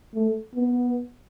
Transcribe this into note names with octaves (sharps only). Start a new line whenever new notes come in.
A3
B3